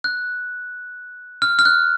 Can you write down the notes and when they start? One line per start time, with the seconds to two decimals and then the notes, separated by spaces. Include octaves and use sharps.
0.04 F#6
1.42 F6
1.59 F6
1.65 F#6